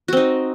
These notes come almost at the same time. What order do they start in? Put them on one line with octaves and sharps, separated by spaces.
F#4 C4 D#4